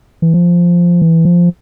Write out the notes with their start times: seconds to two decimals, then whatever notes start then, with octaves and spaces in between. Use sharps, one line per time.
0.22 E3
0.34 F3
1.02 E3
1.25 F3